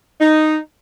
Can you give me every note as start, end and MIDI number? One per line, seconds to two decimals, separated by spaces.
0.20 0.58 63